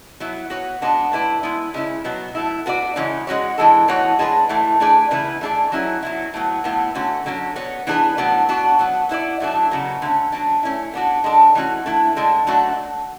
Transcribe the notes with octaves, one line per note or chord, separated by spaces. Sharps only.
F#3 B3 E4
B3 F#4 C#5
G#3 B3 D4 F#4
A3 E4 B4 D5
G#3 B3 E4
C#3 G#3 C#4 E4
B2 F#3 B3
F#3 A3 E4
B3 F#4 B4 D5
C#3 E3 G#3 C#4
G#3 C#4 F#4 C#5
E3 G#3 D4 A4
A2 E3 B3 F#4 C#5
G#3 D4 G#4 B4
A2 E3 A3
A3 D4 G#4 B4 D5
C#3 E3 B3 E4 B4
A3 D4 G#4 D5
F#3 C#4 E4 G#4
F#3 B3 E4
A2 F#3 B3
A2 F#3 B3 E4
D3 A3 C#4 F#4
D3 F#3 C#4
B3 F#4 C#5
E3 B3 D4 G#4 B4
A2 F#3 B3 D4 F#4
B3 D4 F#4
F#3 B3 F#4
B3 E4 B4 D5
A2 F#3 A3 D4
C#3 F#3 B3
D3 A3 C#4
F#3 B3 D4
A3 C#4 E4
B3 D4 F#4
G#3 D4 A4
E3 A3 C#4 F#4
D3 A3 E4
D3 G#3 D4
F#3 A3 D4 F#4